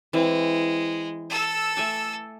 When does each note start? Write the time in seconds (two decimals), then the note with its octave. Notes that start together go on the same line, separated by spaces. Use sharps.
0.13 E3 G#3 C4
1.30 A4 E6
1.77 A3 G#5 D6